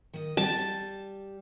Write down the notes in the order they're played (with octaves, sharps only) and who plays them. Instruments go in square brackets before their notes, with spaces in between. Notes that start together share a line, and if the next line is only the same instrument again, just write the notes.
[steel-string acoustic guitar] D#3 D#5
[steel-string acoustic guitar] G3 [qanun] A5